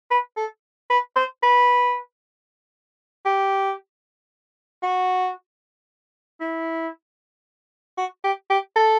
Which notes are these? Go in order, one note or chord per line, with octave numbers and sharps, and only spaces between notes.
B4
A4
B4
C5
B4
G4
F#4
E4
F#4
G4
G4
A4